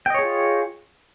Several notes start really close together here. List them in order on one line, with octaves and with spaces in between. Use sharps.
G5 D#5 C#5 G#4 F4